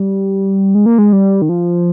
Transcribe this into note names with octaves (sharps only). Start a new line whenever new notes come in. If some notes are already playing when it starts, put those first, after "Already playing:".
Already playing: G3
G#3
A#3
G#3
G3
D#3
F3